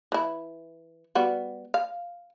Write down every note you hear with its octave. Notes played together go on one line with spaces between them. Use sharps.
E3 E4
G3 B3 F#4
F5